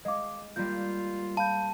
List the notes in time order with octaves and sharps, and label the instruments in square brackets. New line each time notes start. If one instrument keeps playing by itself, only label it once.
[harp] G#3 [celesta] D#5 F5 D6
[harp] G3 A#3 [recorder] F4 [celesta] G6
[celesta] F5 B5 G6 [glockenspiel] A5